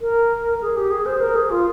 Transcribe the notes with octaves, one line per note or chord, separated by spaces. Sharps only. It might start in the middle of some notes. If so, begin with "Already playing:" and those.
A#4
G#4
G4
G#4
C5
A#4
G#4
F4